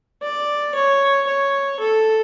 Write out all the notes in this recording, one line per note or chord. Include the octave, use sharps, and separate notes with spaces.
D5
C#5
C#5
A4